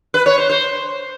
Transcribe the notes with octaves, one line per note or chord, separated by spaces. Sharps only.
B4
C#5
C5
C5